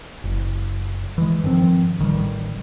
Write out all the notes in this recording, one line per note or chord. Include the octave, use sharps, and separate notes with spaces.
F#1
E3 G#3
G2 D#3 F3 C4
A1 D#3 E3 G3